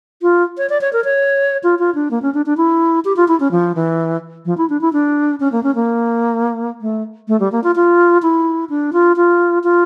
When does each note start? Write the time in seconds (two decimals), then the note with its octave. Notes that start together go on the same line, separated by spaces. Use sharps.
0.22 F4
0.58 C#5
0.69 D5
0.81 C#5
0.93 A#4
1.04 C#5
1.63 F4
1.79 F4
1.95 D4
2.11 A#3
2.22 C#4
2.34 D4
2.46 D4
2.57 E4
3.05 G4
3.16 F4
3.28 E4
3.40 C#4
3.51 F3
3.75 E3
4.46 F3
4.58 E4
4.70 D4
4.81 E4
4.93 D4
5.40 C#4
5.52 A#3
5.63 C#4
5.75 A#3
6.81 A3
7.28 A3
7.40 G3
7.52 A#3
7.64 F4
7.76 F4
8.22 E4
8.69 D4
8.93 F4
9.16 F4
9.64 F4